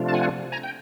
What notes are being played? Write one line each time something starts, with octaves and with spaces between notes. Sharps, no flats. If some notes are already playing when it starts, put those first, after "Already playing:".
Already playing: C3 F3 A3 D4 F4
A5
F#5 G#5
G#5 A#5
G5